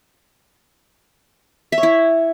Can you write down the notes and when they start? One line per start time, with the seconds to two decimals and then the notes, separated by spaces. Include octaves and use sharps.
1.72 E5
1.78 C#5
1.83 E4